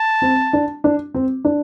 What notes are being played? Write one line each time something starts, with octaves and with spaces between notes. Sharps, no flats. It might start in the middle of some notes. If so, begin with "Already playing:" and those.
Already playing: A5
C4
D4
D4
C4
D4